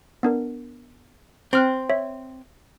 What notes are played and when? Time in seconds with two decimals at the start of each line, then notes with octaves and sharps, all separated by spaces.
0.23 B3 D4 A#4
1.53 C4 G5 F6 F#6
1.90 C#5 E5